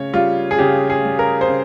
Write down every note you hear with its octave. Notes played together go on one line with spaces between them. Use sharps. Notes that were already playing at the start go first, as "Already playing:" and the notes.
Already playing: C#3 C#5
G3 F4
G#4
C#3 G4
G#4
G3
A#4
C5
C#3